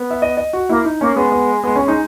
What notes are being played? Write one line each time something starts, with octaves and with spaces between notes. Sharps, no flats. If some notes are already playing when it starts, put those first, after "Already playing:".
Already playing: B3
E5
D#5
D#5
F#4
A#3 E4
D#4
A#3 C#4
G#3 B3
B3
B3
C#4
D#4